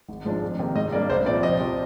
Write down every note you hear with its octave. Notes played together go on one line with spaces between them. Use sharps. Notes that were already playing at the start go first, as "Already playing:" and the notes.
G#1
G#2 F3 G#3 D4
F2
C3 D#3 A#3
G#2 D#5
G3 A#3 D4 D5
C2 C5
A#2 F3 C4 D5
F2 D#5
C3 F3